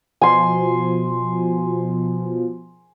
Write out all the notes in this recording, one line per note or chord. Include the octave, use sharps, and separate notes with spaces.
B2 F3 G#5 C6